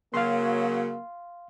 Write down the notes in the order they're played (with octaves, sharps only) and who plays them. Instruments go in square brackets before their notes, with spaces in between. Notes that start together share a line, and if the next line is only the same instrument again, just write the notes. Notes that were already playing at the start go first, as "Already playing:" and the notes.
[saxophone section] C#3 F#3 [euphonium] A#3 [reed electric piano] F5 C6